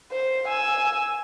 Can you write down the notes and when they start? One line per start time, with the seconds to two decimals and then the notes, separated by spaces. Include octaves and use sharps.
0.12 C5
0.48 G#5 E6